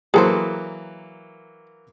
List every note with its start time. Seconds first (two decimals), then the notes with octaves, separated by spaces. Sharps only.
0.14 E3 F#3 A#3 G#4 A4 C5